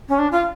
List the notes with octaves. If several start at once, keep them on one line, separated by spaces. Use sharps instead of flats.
C#4
D4
F4